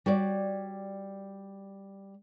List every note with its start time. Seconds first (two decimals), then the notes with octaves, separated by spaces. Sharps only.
0.06 G3 F#4 C#5 D5